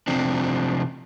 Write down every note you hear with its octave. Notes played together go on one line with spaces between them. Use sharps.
C3 F3 C4 D4